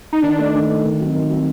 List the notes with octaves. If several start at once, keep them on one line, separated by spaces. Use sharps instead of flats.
D#4
D#3 D4
A3 D#4
D#3
A3 D#4
D#3
F#3 C4
D#3
F#3 C4